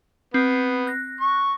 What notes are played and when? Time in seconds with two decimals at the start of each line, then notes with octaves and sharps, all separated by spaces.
0.34 B3 C4
0.87 F#6 A#6
1.21 C#6